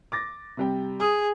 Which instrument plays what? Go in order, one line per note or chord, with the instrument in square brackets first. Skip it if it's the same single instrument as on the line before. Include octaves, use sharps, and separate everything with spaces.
[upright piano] D6 A6 A#6
C3 G3 G5
[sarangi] G#4 [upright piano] D#6